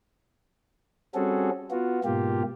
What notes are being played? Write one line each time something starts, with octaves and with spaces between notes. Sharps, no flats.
G3 C4 C#4 F#4 G#4 A4
B3 F4 F#4
G#2 B2 A#3 F4 G4